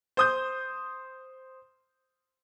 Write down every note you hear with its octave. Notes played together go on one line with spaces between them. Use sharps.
C5 D#6 G6